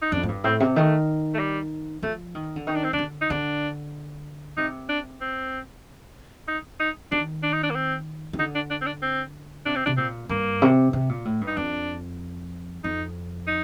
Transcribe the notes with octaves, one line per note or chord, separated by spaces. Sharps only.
D#4
F2 D4
A2
G2
A2 C4
C3
D#3 A3
A3
G3
F3 A3
D#3
D3
D#3 D#4
D4
C4
D#3 D4
D3
D#4
D3 D4
C3 D#4
D4
C4
D#4
D#4
D#3 D4
D4
D#4
D4
A#3
C4
D#3
D3 D#4
D4
D4
C4
D4
C4
C3 D4
C4
C3 D4
A#2 C4
G2 A#3
C3
C3
A#2
A2
G2
D#4
F2 D4
F2 D#4
D#4